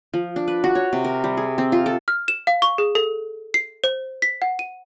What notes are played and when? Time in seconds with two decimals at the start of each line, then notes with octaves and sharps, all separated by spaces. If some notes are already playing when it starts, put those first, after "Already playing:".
0.13 F3
0.36 D4
0.48 B4
0.64 F#4
0.75 C#5
0.93 C3
1.04 A#4
1.24 G3
1.37 G#4
1.58 C4
1.72 F4
1.86 A4
2.08 F6
2.28 E7
2.47 F5
2.62 C#6
2.78 G#4
2.95 A4
3.54 C7
3.84 C5
4.22 B6
4.42 F#5
4.59 D#7